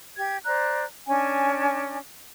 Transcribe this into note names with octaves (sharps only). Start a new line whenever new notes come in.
G4 G#6
C5 D5 A#5 F#6
C#4 D4 G#5